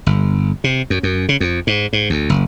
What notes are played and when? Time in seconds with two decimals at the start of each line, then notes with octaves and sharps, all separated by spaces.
0.06 G1
0.64 C3
0.90 F#2
1.03 F#2
1.29 C#3
1.40 F2
1.67 G#2
1.93 G#2
2.10 D2
2.29 F#1